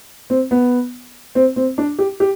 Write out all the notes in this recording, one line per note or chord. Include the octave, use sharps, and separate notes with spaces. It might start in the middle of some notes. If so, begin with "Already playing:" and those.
C4
B3
C4
C4
D4
G4
G4